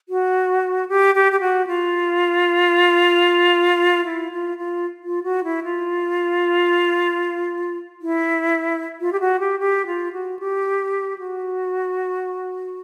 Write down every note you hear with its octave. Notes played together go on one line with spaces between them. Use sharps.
F#4
G4
G4
G4
F#4
F4
E4
F4
F4
F4
F#4
E4
F4
E4
F4
G4
F#4
G4
G4
F4
F#4
G4
F#4